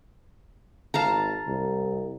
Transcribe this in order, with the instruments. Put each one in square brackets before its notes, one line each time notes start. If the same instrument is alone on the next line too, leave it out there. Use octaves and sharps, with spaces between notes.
[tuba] G#1 [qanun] F5 A5 A#5
[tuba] C2